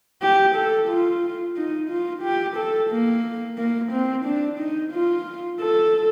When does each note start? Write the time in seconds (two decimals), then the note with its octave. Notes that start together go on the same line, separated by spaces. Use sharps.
0.22 G4
0.55 A4
0.88 F4
1.56 D#4
1.89 F4
2.23 G4
2.57 A4
2.90 A#3
3.58 A#3
3.92 C4
4.25 D4
4.59 D#4
4.92 F4
5.61 A4